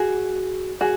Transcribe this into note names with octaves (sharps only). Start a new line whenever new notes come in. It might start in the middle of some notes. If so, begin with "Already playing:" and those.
Already playing: F#4 G#4
F#4 G#4